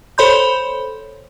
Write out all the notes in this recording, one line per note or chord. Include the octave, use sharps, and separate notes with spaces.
A4 C5 C#5 B5 C6 G6